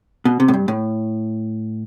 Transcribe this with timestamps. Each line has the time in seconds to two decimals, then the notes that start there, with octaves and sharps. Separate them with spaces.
0.25 B2
0.40 C3
0.48 A2
0.54 G2
0.68 A2